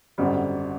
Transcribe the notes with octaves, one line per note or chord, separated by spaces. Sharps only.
G#1 F#2 D3 G3